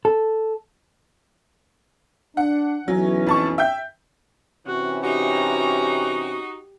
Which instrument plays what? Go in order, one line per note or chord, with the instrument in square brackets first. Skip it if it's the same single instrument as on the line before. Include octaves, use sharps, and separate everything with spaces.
[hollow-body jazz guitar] A4
[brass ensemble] D4 [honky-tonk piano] F#5
[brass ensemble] B1 E3 C#4 [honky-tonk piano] F#3
[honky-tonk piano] F2 A5 C#6
E5 G5 G6
[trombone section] C3 E3 C#4 [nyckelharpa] F#4
[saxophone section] D#4 F#4 [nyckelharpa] G4 A#5